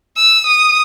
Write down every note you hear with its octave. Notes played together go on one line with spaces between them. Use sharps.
E6
D#6